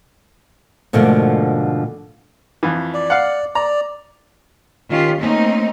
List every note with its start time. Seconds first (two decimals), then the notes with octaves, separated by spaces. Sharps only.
0.93 G#2 B2 D3 F3 A3 A#3
2.63 F2 E3
2.94 D5
3.10 F5 F#5
3.55 D5 A#5
4.90 D#3 C#4 F4 G4
5.19 A3 A#3 C4 C#4 D#4